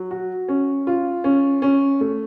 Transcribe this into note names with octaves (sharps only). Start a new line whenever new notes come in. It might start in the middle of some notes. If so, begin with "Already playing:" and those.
Already playing: F#3
F#4
C#4
F4
C#4
C#4
A3